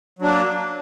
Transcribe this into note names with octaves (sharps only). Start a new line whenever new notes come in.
F#3 A#3 D4